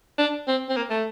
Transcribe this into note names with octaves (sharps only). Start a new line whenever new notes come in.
D4
C4
C4
A#3
A3